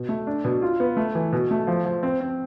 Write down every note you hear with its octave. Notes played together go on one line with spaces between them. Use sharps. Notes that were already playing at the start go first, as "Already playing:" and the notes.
Already playing: B2
A3
D4
B2
F4
B3
A3
E3
B2
A3
F3
F3
C4
C4